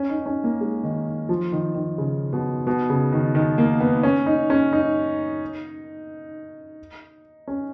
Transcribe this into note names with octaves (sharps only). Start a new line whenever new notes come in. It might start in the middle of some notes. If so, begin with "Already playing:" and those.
Already playing: C#4
D#4
C#4
A#3
G#3
D#3
F3
D#3
D#3
C#3
B2
B2
C#3
D#3
D#3
A#3
B3
C#4
D#4
C#4
D#4
C#4